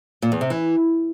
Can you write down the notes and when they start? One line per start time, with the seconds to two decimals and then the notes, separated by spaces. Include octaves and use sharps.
0.22 A#2
0.32 E2
0.41 C3
0.50 E3